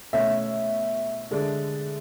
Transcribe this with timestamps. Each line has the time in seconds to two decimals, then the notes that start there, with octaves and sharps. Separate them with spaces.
0.13 B2 A3 C#4 E5
1.31 D3 G#3 D4